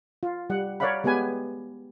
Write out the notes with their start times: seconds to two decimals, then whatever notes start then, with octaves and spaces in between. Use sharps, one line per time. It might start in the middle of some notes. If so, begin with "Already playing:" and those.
0.23 F4
0.50 G3 F#5
0.80 A#4 C#5 D5 F5 F#5 B5
1.04 G#3 B3 G4 B4 G#5